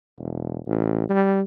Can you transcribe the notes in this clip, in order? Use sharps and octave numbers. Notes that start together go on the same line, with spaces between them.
E1
A1
G3